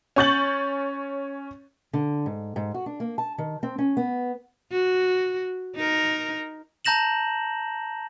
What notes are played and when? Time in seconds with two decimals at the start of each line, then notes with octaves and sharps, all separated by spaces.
0.16 C#4 C#5 C#6 G6 A6 F#7
1.93 D3
2.26 G#2
2.56 G#2
2.74 F#4
2.86 D4
3.00 A#3
3.18 A5
3.38 D#3
3.63 C4
3.78 C#4
3.97 B3
4.71 F#4
5.75 D#4 A#4
6.85 A5 A#5 G6 A#6 E7 F#7